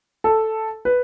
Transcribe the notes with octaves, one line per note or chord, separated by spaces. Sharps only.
A4
B4